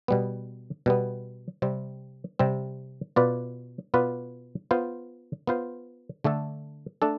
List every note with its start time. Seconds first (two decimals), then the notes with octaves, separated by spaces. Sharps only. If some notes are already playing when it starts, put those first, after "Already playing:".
0.08 B2 G3 B3
0.86 B2 G3 B3
1.62 C3 G3 C4
2.39 C3 G3 C4
3.16 B2 B3 F4 B4 D5
3.94 B2 B3 F4 B4 D5
4.71 B3 F4 C5
5.47 B3 F4 C5
6.24 D3 A3 D4 A4
7.02 A3 D4 A4